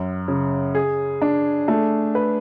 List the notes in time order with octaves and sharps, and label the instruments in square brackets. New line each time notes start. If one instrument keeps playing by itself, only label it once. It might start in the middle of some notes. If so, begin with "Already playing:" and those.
Already playing: [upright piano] F#2
C#3
G#4
D4
A3
B4